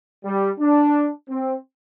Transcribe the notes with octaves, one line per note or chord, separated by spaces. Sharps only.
G3
D4
C4